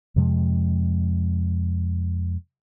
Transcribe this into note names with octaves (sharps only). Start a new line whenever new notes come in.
F2 C3 F3 G#3